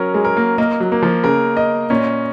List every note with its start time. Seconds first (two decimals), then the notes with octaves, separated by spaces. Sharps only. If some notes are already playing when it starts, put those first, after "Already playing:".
Already playing: F#3 C#4 A#4
0.14 G#3
0.25 A#4
0.37 A#3
0.58 A#3 D#5
0.80 F#3
0.92 A#3
1.02 F3
1.24 C#3 A#4
1.57 D#5
1.90 A#2 C#4